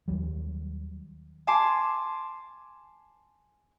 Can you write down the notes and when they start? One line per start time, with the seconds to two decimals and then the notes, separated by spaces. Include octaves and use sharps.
0.08 D#2 F#3 G3
1.47 G#5 A5 C6 D6